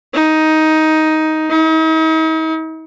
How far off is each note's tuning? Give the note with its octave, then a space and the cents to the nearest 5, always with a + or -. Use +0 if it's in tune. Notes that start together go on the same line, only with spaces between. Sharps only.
D#4 +10
D#4 +45